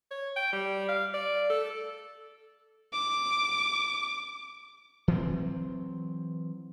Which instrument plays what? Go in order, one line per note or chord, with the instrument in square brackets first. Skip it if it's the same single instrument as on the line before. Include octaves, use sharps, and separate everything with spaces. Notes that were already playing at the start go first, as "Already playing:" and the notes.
[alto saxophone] C#5
G5
G3
F5
D5
A4
[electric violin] D6
[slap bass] E3 F#3 C4